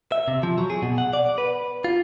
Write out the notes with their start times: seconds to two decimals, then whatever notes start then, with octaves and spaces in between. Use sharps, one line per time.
0.12 E5
0.28 C3
0.43 F3
0.58 F#3
0.70 G#4
0.83 B2
0.98 F#5
1.13 D5
1.38 B4
1.84 F4